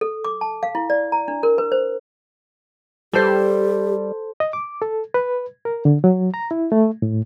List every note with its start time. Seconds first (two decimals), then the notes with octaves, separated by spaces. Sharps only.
0.01 A4
0.24 D6
0.41 A5
0.63 F5
0.75 E4
0.90 D5
1.12 A#5
1.28 D4
1.43 A#4
1.58 B4
1.72 C5
3.13 G3 G4 A4 C5
4.40 D#5
4.53 D6
4.82 A4
5.14 B4
5.65 A#4
5.85 D3
6.04 F#3
6.34 A#5
6.51 E4
6.72 A3
7.02 A2